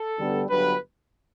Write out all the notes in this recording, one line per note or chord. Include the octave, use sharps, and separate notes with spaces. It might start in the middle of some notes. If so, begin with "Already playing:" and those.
Already playing: A4
D2 D3 G3 B3 D4
G1 G2 F#3 B4